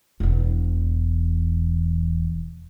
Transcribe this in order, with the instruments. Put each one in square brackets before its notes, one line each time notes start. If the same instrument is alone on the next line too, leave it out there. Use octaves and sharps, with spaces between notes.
[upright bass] E1 E2